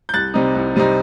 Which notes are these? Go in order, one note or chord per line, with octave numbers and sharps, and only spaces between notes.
G6
C2 F#6 A6
C3 G3 C4 D#4
C2
C3 G3 C4 D#4